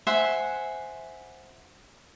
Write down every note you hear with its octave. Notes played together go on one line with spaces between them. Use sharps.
C5 E5 F#5 G#5